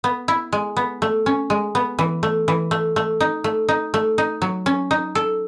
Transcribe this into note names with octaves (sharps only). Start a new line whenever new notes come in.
B3
E4
G#3
B3
A3
C#4
G#3
B3
E3
A3
E3
A3
A3
D#4
A3
D#4
A3
D#4
F#3
C#4
D#4
A4